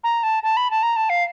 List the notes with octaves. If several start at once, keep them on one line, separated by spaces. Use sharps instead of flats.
A#5
A5
A5
B5
A5
A#5
A5
F5